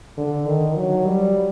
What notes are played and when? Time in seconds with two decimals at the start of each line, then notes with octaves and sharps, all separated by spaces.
0.17 D3
0.46 D#3
0.76 F#3
1.05 G3